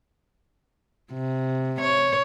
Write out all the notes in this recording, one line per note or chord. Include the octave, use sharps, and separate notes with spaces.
C3
C#5